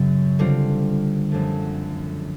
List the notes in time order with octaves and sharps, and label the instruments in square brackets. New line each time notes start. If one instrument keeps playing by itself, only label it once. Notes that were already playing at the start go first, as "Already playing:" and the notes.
Already playing: [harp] F#2 C#3 F#3
D3 G3 C4 F4
F#2 D3 F3 A3